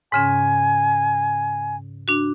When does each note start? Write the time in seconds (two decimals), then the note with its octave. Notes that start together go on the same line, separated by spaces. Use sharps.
0.12 G#2 C#3 C#4 G#5
2.08 D4 F#4